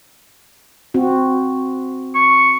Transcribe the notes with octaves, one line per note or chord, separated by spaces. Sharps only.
C4 F#4
C#6